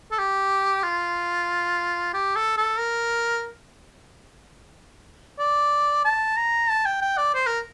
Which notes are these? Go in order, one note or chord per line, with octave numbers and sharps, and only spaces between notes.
A4
G4
F4
G4
A4
A4
A#4
D5
A5
A#5
A5
G5
G5
D5
C5
A#4